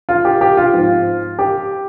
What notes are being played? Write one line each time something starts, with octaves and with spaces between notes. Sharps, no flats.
F4
G4
G4
F4
G#2 F3 C4
G4